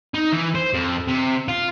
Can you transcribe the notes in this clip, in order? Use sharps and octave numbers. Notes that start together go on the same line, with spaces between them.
D#4
E3
C5
F2
C3
F4